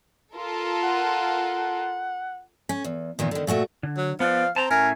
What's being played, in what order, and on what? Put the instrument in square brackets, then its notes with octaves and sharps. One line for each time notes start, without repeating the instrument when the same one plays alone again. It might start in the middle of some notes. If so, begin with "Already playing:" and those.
[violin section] F4 A4 A#4
[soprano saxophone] F#5
[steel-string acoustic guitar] C#4
E2
E2 A#2 D#3
D3 D#3
A#2 A3 F#4 E5
[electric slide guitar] D3
[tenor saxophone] F#3
[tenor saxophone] F3 [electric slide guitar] B3 B4 D5 [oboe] F5
[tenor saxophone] C4 [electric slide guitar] A5 A#5
[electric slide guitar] A2 C#4 E5 [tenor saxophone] A#4 [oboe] G#5